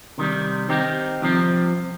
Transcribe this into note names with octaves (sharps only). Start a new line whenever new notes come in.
C3 D#3 G3
D#3 C4 D#4 G4
C2 C3 F3 C4